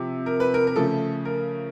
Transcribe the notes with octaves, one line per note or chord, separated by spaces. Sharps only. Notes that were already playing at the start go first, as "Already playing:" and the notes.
Already playing: C3 F3
A#4
B4
A#4
A#4
C#3 F3 A3 A4
A#4